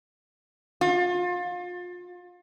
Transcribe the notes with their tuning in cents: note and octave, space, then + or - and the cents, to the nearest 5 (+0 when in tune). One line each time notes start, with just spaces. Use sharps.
F4 +30